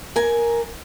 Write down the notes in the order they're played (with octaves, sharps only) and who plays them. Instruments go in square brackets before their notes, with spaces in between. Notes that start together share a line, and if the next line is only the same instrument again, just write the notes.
[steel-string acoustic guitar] A#4 G#5